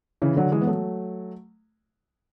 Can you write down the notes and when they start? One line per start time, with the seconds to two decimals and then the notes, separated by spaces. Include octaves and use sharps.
0.22 C#3 E3
0.36 D3 F#3
0.51 E3 G#3
0.61 B3
0.67 F#3 A3